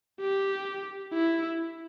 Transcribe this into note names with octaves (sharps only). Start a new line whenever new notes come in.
G4
E4